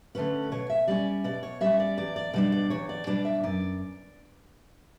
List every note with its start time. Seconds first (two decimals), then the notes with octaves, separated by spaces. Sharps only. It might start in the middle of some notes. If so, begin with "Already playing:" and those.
0.15 D3 A3 C#4 B4
0.52 B2 C#5
0.70 E5
0.88 G3 C#4 D5
1.24 B2 D5
1.43 C#5
1.61 G3 C#4 E5
1.80 D5
1.97 E2 D5
2.16 D5
2.33 B2 G3 D4 D5
2.52 D5
2.70 E2 C#5
2.89 D5
3.07 B2 G3 D4 D5
3.25 E5
3.43 F#2 D5